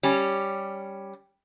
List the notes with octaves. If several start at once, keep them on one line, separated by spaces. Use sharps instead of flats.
G3 C#4 G4